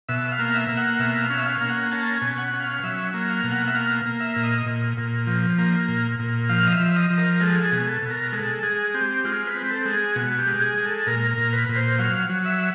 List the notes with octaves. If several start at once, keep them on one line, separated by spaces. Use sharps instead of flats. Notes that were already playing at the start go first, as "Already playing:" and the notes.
B2 E5
F5
A#3
E5
A#3
F#5
B2 E5
F5
C#4
E5
F5
A#3
F#5
C#4 A5
G#5
B2
F#5
C#4
F5
F#3 E5
A#3
F5
B2
F#5
E5
A#3 F5
A#3
E5
A#2
D#5
A#2
A#2
F3
A#3
A#2
A#2
F3 F5
D#5
E5
F3
D#5
F3
A#4
G#3 A4
G#4
B2
A4
B2
A#4
G#3 A4
G#3 G#4
C4 G4
G#3 F4
B4
C4
A4
G#3
G#4
B2 F#4
G4
G#3
G#4
G#3
A4
A#2 A#4
A#4
A#2
B4
A#2
C5
F#3 F5
F#3
E5